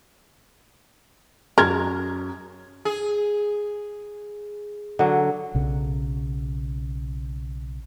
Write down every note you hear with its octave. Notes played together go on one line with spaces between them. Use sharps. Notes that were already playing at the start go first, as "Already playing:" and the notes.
F#2 A#4 G#6
G#4
D3 F#3
B1 C#3